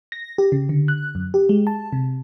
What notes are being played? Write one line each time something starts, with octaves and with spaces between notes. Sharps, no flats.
A#6
G4
C#3
D3
F#6
F#2
G4
G#3
A5
C3